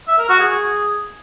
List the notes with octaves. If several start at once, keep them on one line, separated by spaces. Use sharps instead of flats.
E5
A#4
F#4
G#4